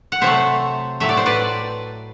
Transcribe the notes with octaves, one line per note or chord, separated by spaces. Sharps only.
F#5
C3 F#3 A3 C5 E5
A2 F#3 A3 E5
D5
C5
B4 D5